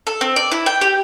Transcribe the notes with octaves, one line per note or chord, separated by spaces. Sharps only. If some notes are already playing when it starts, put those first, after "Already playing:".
A4
C4
D5
E4
G5
G4